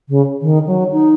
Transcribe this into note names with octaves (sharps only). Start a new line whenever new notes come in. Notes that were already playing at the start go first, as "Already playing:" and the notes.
C#3
D#3
F#3
D#4